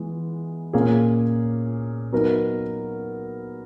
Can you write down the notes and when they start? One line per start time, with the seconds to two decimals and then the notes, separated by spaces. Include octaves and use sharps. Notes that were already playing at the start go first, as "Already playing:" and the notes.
Already playing: E3 G#3 B3
0.73 A#2 A#3 C#4 G#4
2.12 F#3 B3 D#4 A#4